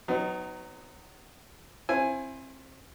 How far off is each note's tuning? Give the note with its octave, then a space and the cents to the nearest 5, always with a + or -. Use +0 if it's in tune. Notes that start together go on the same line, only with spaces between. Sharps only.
F#3 +0 B3 +35 D#4 +0
C4 +30 E4 +25 G#5 -5